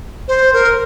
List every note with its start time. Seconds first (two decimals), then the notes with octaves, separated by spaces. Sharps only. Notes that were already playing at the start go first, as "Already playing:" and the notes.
0.28 C5
0.53 A#4